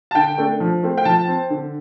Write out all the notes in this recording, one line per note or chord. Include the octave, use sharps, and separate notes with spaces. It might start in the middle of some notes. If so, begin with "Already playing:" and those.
A5
D3 G5
A3 D4
F3
A3 C4
G5
F3 A5
C4
D3